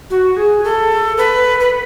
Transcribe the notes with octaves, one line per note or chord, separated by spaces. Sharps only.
F#4
G#4
A4
B4
B4